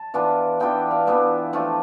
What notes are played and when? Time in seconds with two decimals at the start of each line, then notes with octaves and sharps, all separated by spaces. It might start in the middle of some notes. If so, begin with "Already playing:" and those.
Already playing: A5
0.14 E3 B3 D4 F4
0.60 E3 B3 D4 F4 G5
0.91 F5
1.07 E3 B3 D4 F4 E5
1.53 F3 A3 D4 F4